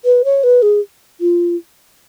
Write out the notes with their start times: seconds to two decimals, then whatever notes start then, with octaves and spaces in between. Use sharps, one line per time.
0.05 B4
0.24 C#5
0.43 B4
0.62 G#4
1.21 F4